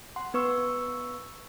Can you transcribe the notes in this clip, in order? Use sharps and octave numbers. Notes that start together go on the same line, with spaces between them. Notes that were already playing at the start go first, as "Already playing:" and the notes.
F#5 C6
B3 B4 C#6 E6